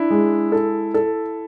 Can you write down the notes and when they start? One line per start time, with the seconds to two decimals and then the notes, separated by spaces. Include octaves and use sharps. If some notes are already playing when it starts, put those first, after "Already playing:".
Already playing: D4 E4
0.10 G#3
0.52 A4
0.94 A4